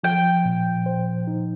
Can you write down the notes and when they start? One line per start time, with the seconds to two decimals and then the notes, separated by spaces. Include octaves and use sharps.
0.04 F3 G5
0.45 A#2
0.86 C5
1.27 D#4